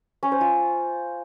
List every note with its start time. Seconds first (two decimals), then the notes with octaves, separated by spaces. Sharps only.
0.23 C#4
0.32 C5
0.41 F4